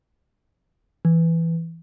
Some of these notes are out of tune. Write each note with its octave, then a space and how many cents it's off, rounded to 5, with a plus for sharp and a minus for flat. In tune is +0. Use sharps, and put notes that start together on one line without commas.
E3 +5